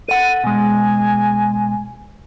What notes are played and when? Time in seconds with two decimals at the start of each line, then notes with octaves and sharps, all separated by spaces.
0.08 A4 F#5 D#7
0.44 B2 G#3 G#5